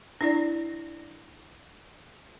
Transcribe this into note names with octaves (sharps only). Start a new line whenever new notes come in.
D4 E4 D5